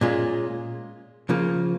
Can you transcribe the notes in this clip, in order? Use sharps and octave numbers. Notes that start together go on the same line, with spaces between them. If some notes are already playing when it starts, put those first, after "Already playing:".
A#2 G#3 C#4 F4
C#3 F3 A#3